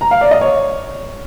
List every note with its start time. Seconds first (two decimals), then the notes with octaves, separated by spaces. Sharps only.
0.01 A#5
0.11 F5
0.21 D5
0.31 D#5
0.41 C#5